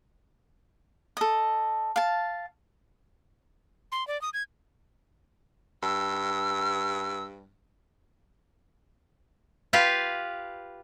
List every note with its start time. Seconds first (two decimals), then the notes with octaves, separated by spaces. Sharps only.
1.17 A4 D#5
1.96 F5 A5
3.92 C6
4.08 D5
4.22 D#6
4.34 G#6
5.83 G2 E6
9.73 F4 G4 B4 F5